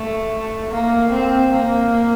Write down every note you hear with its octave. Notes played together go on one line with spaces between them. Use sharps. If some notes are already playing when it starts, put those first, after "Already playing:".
Already playing: A3
A#3
C4
A#3